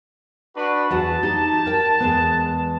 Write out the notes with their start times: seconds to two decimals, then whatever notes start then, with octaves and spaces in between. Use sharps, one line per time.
0.55 D4 F#4 B4
0.91 E2 F#4 F#5 A5
1.23 D#4 G4
1.66 A#4 G5
2.00 E2 G#3 B3